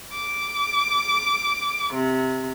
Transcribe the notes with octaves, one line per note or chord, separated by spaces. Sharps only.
D6
C3